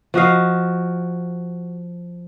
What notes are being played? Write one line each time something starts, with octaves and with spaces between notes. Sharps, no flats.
F3 F#4 D#5 F5